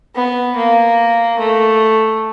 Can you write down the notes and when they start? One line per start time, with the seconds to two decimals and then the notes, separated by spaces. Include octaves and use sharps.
0.16 B3
0.57 A#3
1.39 A3